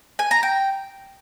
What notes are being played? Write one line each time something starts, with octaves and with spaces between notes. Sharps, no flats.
G#5
A#5
G5